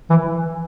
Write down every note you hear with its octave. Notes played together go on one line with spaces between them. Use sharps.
E3